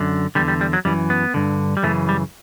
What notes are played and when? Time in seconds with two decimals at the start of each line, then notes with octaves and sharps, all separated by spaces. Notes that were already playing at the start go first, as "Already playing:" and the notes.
Already playing: F#2 D3
0.35 E2 D3 G3
0.48 G3
0.61 G3
0.73 F#3
0.85 F#2 E3 G3
1.10 B3
1.34 G2 D3
1.77 G3
1.83 F#2 C#3 E3 A3
2.09 G3